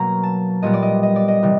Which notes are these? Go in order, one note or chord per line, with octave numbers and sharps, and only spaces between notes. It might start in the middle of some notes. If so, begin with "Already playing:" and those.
Already playing: B2 F#3 A#3 A#5
A5
A#2 G3 B3 D#5
D5
D#5
D#5
D5
D#5
C3 E3 G3